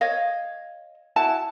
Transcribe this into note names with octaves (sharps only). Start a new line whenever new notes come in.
C#5 D#5 F5
E4 F#4 A5